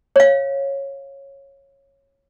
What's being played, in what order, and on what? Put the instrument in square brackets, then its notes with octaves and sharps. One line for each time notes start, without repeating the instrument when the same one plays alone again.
[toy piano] C#5 F5